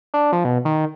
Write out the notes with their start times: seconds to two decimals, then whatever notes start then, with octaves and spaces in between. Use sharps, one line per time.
0.14 D4
0.32 F3
0.45 B2
0.65 D#3